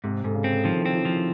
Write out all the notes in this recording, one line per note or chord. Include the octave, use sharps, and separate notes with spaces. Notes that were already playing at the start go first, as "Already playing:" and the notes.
G#2 C3
G#2 D3
C#3
C4
D3
D#3 F3
E3
C4
E3
F3
E3